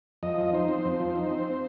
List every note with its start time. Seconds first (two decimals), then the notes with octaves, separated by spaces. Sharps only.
0.23 F2 D#5
0.38 F3
0.53 D#4 C5
0.68 C4
0.85 F2
1.00 F3
1.16 D#4
1.31 C4